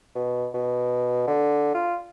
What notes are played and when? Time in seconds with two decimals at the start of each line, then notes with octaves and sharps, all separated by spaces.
0.15 B2
0.54 B2
1.28 D3
1.74 F4